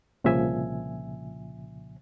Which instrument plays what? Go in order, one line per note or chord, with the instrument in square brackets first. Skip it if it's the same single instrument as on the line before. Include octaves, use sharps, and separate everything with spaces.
[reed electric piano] C2 A#2 C#3 F3 E5 G#5